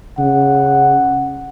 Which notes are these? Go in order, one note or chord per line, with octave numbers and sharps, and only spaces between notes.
C#3 F#5